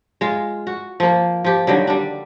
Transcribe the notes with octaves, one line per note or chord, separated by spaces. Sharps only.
G#3 F4
F#4
F3 A#3
F3 G4
D3 D#3 F#3 G3
G3 D4